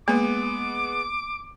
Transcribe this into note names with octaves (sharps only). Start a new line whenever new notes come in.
G#3 A#3 B3 D6